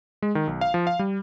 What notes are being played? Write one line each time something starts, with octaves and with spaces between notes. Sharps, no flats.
G#3
D#3
B1
F5
F3
F5
G3